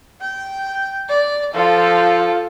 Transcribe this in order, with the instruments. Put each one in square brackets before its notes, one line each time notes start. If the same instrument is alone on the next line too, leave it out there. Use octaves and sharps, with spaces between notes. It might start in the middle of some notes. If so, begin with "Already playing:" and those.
[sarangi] G5
D5
[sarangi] F3 [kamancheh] F4 A4